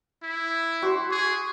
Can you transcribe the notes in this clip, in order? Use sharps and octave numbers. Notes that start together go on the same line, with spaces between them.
E4
F#4 C6
G#4